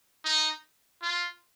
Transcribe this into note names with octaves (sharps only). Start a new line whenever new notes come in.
D#4
F4